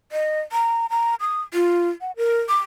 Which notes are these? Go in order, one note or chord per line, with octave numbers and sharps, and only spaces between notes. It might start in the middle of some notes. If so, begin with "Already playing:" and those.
D#5
A#5
A#5
D#6
F4
F#5
A#4
D6